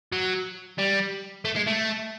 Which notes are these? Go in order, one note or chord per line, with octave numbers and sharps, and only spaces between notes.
F#3
G3
A3
G#3
A3